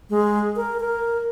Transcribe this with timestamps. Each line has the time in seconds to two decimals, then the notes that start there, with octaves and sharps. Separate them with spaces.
0.10 G#3
0.56 A#4
0.80 A#4